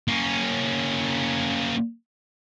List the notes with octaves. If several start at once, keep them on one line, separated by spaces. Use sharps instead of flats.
A#3 C#4